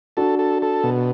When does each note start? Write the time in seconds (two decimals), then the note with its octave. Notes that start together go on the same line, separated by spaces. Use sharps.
0.17 D4 F#4 A4
0.39 A4
0.62 A4
0.83 B2